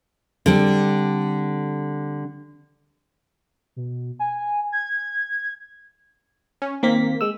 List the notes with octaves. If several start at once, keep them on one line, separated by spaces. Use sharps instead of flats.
D3 G3 C4
B2
G#5
G#6
C#4
D#3 A#3 C4 B6
G#3 E6